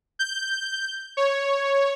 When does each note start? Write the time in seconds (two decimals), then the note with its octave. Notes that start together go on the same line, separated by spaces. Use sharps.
0.19 G6
1.17 C#5